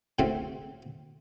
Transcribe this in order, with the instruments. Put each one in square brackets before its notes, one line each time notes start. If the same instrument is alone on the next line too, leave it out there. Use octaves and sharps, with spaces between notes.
[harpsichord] A2 C#3 A3 C4 C#4 F#4